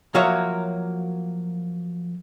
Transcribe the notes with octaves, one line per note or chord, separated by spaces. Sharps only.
F3 F#3 A#3 F#4 C#5 E5